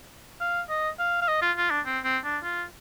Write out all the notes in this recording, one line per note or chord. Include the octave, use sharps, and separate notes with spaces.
F5
D#5
F5
F5
D#5
F4
F4
D4
C4
C4
D4
F4